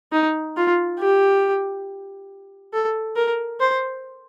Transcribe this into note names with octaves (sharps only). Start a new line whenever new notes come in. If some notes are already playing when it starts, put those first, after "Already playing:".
D#4
F4
G4
A4
A#4
C5